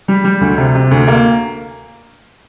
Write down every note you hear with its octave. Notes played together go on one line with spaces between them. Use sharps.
G3
G3
D2
C3
C3
D2
A#3